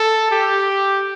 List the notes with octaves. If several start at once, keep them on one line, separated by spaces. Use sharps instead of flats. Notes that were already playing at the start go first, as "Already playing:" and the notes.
Already playing: A4
G4